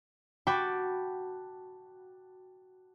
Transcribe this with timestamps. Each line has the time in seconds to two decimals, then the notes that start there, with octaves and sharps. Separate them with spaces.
0.47 F#4 G5 A5 B5 D6